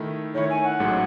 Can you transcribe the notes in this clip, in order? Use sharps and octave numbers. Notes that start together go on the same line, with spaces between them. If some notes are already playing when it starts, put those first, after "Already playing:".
Already playing: D#3 A3 E4
D#3 A3 E4 C#5
G#5
F#5
A1 G#2 F#3 A3